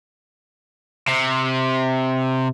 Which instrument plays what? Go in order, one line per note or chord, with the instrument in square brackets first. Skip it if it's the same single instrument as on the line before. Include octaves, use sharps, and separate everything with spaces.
[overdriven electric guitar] C3